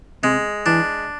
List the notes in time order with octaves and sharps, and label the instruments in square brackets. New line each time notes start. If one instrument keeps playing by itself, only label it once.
[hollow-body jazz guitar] C3 [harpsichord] G#3
[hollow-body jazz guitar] E3 [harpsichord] D4